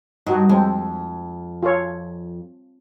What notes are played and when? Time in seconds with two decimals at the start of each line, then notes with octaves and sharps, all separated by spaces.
0.27 G2 D#4 F#4
0.49 F2 G#3 C4
1.63 F4 A4 C#5